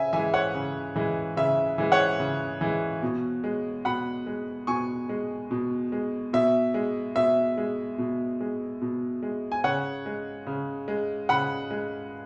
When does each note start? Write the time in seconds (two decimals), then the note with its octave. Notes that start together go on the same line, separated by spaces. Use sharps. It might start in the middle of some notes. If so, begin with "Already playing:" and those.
Already playing: C#3 E5 G#5
0.13 E3 G#3 E5 G#5
0.34 C#5 F#5
0.55 C#3
0.96 E3 G#3
1.37 C#3 E5
1.78 E3 G#3
1.92 C#5 F#5
2.20 C#3
2.61 E3 G#3
3.03 B2
3.44 G#3
3.85 B2 F#5 B5
4.27 G#3
4.67 B2 G#5 C#6
5.09 G#3
5.51 B2
5.92 G#3
6.33 B2 E5
6.74 G#3
7.16 B2 E5
7.58 G#3
7.98 B2
8.41 G#3
8.82 B2
9.23 G#3
9.52 G#5
9.64 C#3 C#5 F#5
10.06 G#3
10.47 C#3
10.88 G#3
11.29 C#3 F#5 B5
11.71 G#3